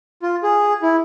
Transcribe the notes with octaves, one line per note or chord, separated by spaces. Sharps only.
F4
G#4
E4